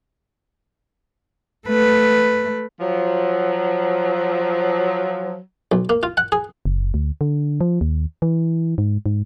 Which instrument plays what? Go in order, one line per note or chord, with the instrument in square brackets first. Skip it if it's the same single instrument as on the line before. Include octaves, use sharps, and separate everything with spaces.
[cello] A3 B4
[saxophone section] F3 F#3
[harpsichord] B1
A#3
F4
F#5
G#4
[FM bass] F#1
D2
D3
F3
D#2
E3
G#2
G#2